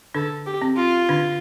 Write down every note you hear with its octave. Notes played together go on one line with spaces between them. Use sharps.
D3 D4 A4
G4
C4
F4
D3 D4